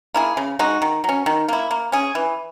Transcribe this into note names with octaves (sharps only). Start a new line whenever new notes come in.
A#3 E4 G#4
C#3
G#3 D#4 F#4
D#3
F#3 C#4
D#3
A#3 E4
A#3
C#4 G#4
E3